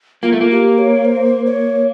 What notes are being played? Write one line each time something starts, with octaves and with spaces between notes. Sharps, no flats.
A#3 F4
A3
A#3
G4
C#5
C5
C#5